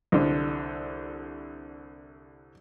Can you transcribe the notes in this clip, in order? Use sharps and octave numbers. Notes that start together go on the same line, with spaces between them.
C2 D3